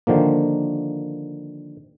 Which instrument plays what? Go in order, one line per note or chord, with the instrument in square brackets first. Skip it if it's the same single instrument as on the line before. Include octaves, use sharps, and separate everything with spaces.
[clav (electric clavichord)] D3 D#3 F3 A#3